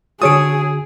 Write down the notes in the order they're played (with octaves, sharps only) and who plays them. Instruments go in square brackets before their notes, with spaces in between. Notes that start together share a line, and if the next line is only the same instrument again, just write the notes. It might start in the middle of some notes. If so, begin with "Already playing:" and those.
[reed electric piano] D3 F#4 [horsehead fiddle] G#4 [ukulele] A4 C#5 [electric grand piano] D#6 D7